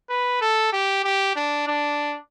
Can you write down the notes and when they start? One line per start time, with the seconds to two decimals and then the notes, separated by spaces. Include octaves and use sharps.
0.09 B4
0.41 A4
0.73 G4
1.04 G4
1.36 D4
1.67 D4